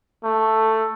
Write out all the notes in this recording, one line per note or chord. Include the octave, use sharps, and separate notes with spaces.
A3